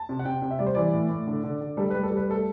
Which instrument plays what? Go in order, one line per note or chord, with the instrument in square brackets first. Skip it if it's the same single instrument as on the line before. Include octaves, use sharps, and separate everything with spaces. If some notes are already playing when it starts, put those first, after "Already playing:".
Already playing: [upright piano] A5
C3
F#5
C3 G5
C3
E5
G3 D5
C5
E3 D5
A2
A2
D3
D3
D3
G3 A4
G3 B4
A4
G3
B4
A3 A4